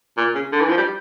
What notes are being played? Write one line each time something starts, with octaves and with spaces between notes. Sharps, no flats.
A#2
C#3
D3
E3
F3
G3